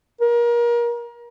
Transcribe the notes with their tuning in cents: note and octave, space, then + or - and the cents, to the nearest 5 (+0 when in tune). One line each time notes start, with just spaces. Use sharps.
A#4 +30